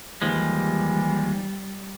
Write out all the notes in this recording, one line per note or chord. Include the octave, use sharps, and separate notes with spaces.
D#2 E3 F3 G3 G#3